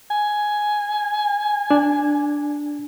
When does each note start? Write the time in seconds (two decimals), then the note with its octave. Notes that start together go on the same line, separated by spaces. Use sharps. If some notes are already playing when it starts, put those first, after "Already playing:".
0.11 G#5
1.71 D4